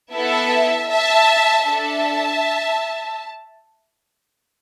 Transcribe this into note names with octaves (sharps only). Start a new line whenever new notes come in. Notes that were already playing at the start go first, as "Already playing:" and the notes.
B3 E4 A4 E5 A5
E5 A5
D4 A4 E5 A5